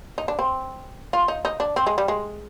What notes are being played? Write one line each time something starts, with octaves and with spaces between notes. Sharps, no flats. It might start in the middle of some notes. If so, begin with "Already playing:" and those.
D#4
D4
C4
F4
D#4
D#4
D4
C4
G#3
G3
G#3